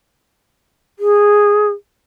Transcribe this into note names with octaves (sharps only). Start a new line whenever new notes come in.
G#4